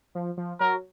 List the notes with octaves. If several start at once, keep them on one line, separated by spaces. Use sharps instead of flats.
F3
F3
F#3 A#4